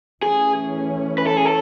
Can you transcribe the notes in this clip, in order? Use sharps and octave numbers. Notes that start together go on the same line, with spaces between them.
E3 A3 C#4 G#4
B4
A4
G#4
A4